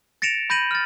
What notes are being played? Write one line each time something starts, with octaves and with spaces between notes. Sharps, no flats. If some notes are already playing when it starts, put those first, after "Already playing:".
A6 A#6 C#7 D7 E7 F7
B5 G6 A#6 D#7 F#7
F6 A6